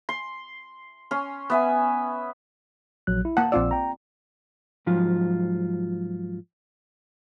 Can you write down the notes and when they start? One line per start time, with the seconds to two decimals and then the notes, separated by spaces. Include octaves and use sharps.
0.09 C6
1.11 C#4 C6
1.50 B3 E5 G#5
3.07 A#1 F#3 F#6
3.25 E4
3.37 A#3 F#5 A5
3.52 A#1 C4 F4 D5 E6
3.71 G5 A#5
4.86 G#2 F3 F#3 F4